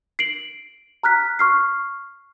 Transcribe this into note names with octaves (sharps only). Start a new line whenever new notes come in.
C7 D7 F#7
A#5 F6 F#6 B6
C#6 F6 C7